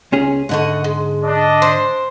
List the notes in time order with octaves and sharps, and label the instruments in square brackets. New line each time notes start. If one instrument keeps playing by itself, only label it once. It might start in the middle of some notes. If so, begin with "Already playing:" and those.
[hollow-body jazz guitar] C#2 C#4 G#4
[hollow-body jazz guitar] G#2 D3 [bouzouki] A3 D#5 F#5
[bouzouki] G#3
[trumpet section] D4 D#5
[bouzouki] C5